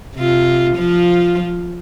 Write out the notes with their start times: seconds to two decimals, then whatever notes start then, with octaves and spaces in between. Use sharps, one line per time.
0.16 C3 F4
0.76 F3 F4